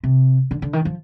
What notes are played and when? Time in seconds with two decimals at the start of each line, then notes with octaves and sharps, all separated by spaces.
0.04 C3
0.51 D3
0.62 D3
0.73 D#3
0.85 F3